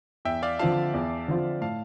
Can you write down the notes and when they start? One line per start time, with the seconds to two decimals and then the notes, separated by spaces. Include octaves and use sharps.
0.25 E2 E5 G5
0.43 D5 F5
0.59 D3 F3 C4 F4 F5 A5
0.94 E2
1.28 D3 F3 C4 F4
1.61 A2 F5 A5